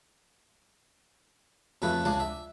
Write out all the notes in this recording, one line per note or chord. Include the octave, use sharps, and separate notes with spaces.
F2 C#3 A3 B4
C#2 C#3 D4 C6
E5